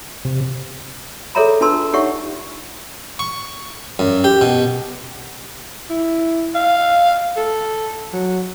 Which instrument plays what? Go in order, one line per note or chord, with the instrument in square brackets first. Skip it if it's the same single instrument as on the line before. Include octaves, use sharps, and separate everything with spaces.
[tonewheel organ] C3
[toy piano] G#4 A4 C#5 E5 A#5 B5
D4 F4 B4 A5 C6 E6
D#4 G4 C#5 E5 F#5 C#6
[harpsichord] C#6
F#2
G4
B2
[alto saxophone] E4
F5
A4
F#3